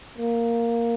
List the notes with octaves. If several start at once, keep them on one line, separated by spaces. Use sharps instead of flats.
A#3